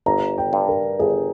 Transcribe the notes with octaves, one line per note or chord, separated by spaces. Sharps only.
G1 A#5
G5
G2
A#4
G1 G#4